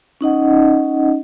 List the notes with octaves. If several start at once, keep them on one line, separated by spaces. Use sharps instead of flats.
C#4 D#4 D#5 F#5